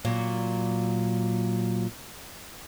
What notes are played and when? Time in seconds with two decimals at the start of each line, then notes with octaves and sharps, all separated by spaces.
0.05 A#2 F#3